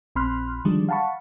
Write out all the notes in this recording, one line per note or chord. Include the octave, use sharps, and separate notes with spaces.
A#1 C4 B5 C6 F6 F#6
D3 D#3 F3 G3 G#3 D4
F5 F#5 A5 B5 C#6